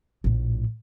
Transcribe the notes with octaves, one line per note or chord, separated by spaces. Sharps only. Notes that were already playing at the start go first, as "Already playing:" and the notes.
A#1 A2